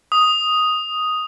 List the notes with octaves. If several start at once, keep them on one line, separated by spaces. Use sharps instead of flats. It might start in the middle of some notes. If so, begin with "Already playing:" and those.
D#6